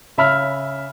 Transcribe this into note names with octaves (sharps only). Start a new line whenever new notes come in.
C#3 E5 B5 F6